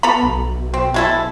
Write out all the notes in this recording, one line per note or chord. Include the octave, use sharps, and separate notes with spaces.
B3 A4 A#5 B5
B1
C4
G#3 E4 A4